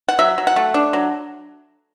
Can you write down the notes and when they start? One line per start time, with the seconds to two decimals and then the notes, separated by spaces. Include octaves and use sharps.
0.08 F#5
0.19 F#3 E5
0.38 F#3
0.47 F#5
0.56 A3
0.74 D4
0.93 F#3